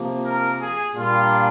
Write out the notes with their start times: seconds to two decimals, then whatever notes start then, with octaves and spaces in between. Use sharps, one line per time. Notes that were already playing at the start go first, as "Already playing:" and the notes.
Already playing: C3 F3 A#3
0.24 A#4
0.60 G#4
0.94 A#2 G3 A#3 D4 F4